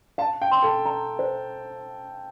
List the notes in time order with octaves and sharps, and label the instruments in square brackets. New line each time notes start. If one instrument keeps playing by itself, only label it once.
[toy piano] F5 [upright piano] A5
[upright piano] G5
[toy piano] C6
[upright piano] A4
[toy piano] A#5
C5